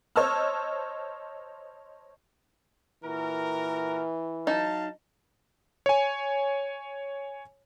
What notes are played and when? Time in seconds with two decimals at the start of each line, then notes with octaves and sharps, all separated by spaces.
0.16 C5 C#5 D#5 A5 E6 F6
3.04 A#2 E3 F#4 A#4
4.47 F#3 D#4 F5 A5
5.86 C#5 G#5